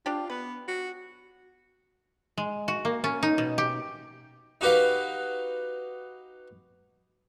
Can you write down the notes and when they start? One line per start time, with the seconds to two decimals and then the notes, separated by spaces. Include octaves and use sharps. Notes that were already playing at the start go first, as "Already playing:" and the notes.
0.06 D4 F4 G4
0.30 B3 B4
0.68 F#4
2.37 G#3
2.68 F#4
2.85 A#3
3.04 C#4
3.23 D#4
3.38 B2
3.58 G4
4.61 D#4 F#4 G4 B4 F5